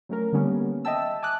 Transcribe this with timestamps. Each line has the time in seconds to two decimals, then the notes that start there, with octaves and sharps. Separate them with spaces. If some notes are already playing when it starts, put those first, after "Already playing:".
0.09 F#3 A3 C#4 A#4
0.33 D3 D#3 G3 A#3 B3 C#4
0.85 D#5 E5 G5 A5 E6
1.22 G#5 A5 D6 D#6 F#6